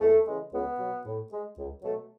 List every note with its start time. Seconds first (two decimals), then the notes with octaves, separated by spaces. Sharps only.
0.01 E2 A3
0.27 C#3 E3 G#3
0.53 C#2 B3
0.79 B2 F#3
1.05 A2
1.31 G#3
1.57 C#2
1.83 B2 F#3 A3